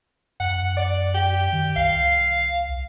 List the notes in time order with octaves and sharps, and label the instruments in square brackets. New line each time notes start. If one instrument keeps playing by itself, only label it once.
[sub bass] F#2 [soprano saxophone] F#5
[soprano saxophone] D5
G4
[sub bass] D#3
[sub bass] C2 [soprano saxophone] F5